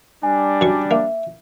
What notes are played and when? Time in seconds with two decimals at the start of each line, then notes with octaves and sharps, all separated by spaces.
0.23 G3 D4 G#5
0.61 F#2 C#6
0.91 A#3 E5